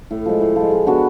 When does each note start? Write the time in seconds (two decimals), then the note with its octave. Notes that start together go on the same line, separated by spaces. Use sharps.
0.11 A2
0.25 F3 G#3
0.41 A2
0.56 F3 G#3
0.71 G#3
0.87 B3 D4 F#4